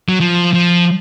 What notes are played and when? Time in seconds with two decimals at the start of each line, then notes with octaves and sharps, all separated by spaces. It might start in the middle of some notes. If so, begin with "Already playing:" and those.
0.09 F#3
0.20 F3
0.53 F3